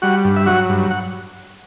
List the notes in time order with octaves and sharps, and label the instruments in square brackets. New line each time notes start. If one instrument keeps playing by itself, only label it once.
[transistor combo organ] G3 F#4 F#5
G2
E5
F#3 F#4 F#5
G2
F#5